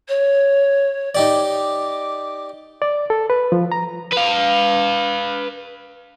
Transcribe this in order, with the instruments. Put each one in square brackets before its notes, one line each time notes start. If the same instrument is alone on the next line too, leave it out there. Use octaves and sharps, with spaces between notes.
[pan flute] C#5
[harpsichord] D#4 G4 D5 [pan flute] D6
[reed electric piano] D5
A4
B4
F3
A#5
[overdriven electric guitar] B4 F5